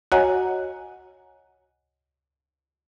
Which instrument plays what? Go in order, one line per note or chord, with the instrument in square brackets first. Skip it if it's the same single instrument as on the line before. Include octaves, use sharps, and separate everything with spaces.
[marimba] F#4 C#5 D#5 F#5 G#5 A#5